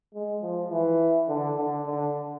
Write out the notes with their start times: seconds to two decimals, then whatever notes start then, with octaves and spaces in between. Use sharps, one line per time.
0.14 G#3
0.42 F3
0.71 E3
1.28 D3
1.57 D3
1.86 D3